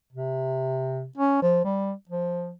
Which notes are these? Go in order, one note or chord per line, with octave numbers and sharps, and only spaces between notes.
C3
C#4
F3
G3
F3